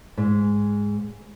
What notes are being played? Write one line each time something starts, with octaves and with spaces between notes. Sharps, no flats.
G#2